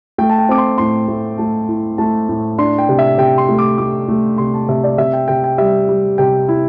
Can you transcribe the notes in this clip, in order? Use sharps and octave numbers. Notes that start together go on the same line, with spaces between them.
A3 G5
A5
G5
C4 D6
C6
A2 C6
A3
A3 A5
E4
A3 A5
A2
D4 C6
G5
C3
E5
C3 G5
C6
A3
D6
A3 D6
A3
C3 C6
A5
C3 E5
D5
C3 E5
G5
C3 G5
G5
G3 E5
G3
C3 G5
E4